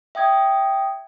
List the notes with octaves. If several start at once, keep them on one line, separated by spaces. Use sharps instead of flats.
E5 G5 D#6 G#6